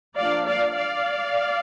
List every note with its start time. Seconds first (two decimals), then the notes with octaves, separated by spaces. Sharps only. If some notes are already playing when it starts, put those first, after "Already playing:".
0.17 F3 A#3 D4 D5 F5
0.47 D5 F5
0.76 D5 F5